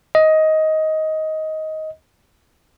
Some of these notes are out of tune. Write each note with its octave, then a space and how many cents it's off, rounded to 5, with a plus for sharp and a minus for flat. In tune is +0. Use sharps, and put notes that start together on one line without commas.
D#5 +15